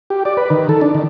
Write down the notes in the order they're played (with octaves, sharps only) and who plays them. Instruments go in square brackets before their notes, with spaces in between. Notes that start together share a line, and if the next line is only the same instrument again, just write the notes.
[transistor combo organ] G4
D5
B4
D#3
A4
D4
D#3